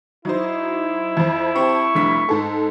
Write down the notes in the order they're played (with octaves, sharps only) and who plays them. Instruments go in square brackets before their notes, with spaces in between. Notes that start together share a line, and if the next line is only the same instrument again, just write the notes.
[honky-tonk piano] F#3 D#4 C5 [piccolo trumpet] E4
[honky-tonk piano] F2 F3
[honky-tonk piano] C4 G4 A5 [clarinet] C#6
[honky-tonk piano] F1 G2 B6
G#2 A4